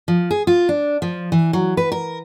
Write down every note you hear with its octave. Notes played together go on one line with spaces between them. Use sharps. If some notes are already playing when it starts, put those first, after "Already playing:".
F3
G#4
F4
D4
F3
E3
F#3
B4
A#4